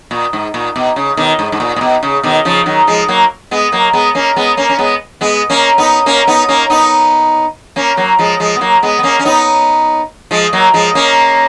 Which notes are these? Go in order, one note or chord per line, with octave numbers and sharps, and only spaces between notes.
A#2
G#2
A#2
B2
C#3
B2 D#3
G#2
G#2
A#2
A#2
B2
C#3
B2 D#3
C#3 F3
D#3 F#3
F3 G#3
F#3 A#3
G#3 B3
F#3 A#3
G#3 B3
A#3 C#4
G#3 B3
A#3 C#4
C#4
G#3 B3
G#3 B3
A#3 C#4
B3 D#4
A#3 C#4
B3 D#4
A#3 C#4
B3 D#4
A#3 C#4
F#3 A#3
F3 G#3
F3 G#3
B3
F#3 A#3
G#3 B3
B3
A#3 C#4
C#4
B3 D#4
F3 G#3
F#3 A#3
F3 G#3
A#3 C#4